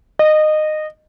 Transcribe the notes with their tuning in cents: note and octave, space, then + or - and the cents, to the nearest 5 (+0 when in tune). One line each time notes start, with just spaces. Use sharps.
D#5 -20